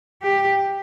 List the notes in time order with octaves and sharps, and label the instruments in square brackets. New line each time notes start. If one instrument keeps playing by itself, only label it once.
[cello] G4